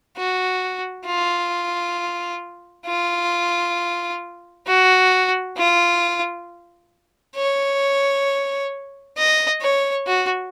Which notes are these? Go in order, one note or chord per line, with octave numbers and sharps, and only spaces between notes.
F#4
F4
F4
F#4
F4
C#5
D#5
C#5
F#4